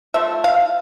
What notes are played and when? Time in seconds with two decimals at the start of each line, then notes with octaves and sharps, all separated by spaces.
0.14 F3 A3 E5
0.44 F5